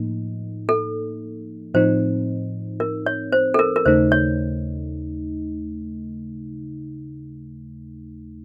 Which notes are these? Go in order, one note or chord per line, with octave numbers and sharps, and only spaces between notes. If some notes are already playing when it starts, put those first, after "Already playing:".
Already playing: A2 F3 A#3 D#4
A4
A2 F3 C4 D#4 C5
A#4
C#5
C5
A4
A#4
A#4
D#2 C#3 A3 D#4 C5
C#5